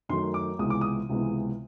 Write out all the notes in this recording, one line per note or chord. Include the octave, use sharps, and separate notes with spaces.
F#2 D#3 F#3 A3 C6
D6
C#2 C3 E3 G#3 B3 D#6
D6
D#6
C#2 C3 E3 G#3 B3